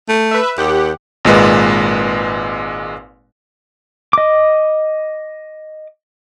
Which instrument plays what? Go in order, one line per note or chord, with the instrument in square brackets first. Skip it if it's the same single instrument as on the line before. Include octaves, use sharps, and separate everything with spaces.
[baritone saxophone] A3
[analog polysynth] B4 E5
[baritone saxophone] D#2 [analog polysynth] G4 F#5
[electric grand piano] G#1 A#2 G#3 B4
[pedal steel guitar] D#5 D6